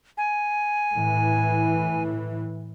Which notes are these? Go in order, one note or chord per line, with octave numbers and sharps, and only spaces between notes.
G#5
A2 E3